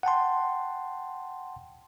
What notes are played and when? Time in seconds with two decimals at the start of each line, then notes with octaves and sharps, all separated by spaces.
0.03 F#5 G5 A5 C6